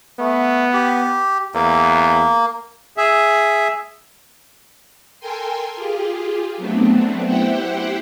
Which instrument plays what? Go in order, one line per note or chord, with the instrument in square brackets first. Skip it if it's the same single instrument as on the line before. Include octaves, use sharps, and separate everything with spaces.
[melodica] A3 [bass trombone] B3
[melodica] G4
[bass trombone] E2 [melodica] A#3
[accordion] G#4 E5
[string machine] A4 A#4 G5 G#5 C6
F4 G4 G#4
F#3 A3 B3 C4 D4
E4 G4 C5 F#5 G5